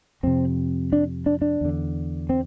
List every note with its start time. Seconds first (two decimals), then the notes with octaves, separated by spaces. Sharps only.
0.23 F2 C3 C4
0.93 D4
1.26 D4
1.42 D4
1.61 E2 D3
2.29 C4